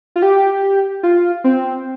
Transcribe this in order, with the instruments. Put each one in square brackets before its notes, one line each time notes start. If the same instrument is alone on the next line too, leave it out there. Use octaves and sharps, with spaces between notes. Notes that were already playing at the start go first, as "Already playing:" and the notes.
[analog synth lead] F4
G4
F4
C4